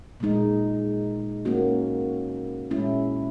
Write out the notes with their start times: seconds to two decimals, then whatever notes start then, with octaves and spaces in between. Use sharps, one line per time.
0.20 A#2 G#3 D#4
1.45 A#3 C#4 F#4
2.71 A#2 G#3 C#4 E4